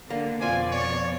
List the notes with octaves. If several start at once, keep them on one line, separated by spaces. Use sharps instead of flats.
D3 A#3
F2 B2 C4 F4 D5 G#5
C#5